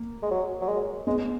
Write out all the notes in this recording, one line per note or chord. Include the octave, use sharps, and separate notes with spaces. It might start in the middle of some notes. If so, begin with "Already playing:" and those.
Already playing: A#3
G#3
F#3
F#3
G#3
G#3 B3